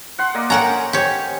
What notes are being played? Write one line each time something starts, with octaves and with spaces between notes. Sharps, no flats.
F#5 C6
A#3 D5 D#5
C#4 A#4 F#5 G5 A#5
G4 C#5